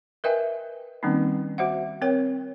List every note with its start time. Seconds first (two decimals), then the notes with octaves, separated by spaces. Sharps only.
0.24 A#4 B4 D#5 E5 G5 G#5
1.03 D#3 G3 A#3 C4 C#4 D#4
1.58 F#4 C5 E5 F#5
2.02 C4 A#4 C#5 G5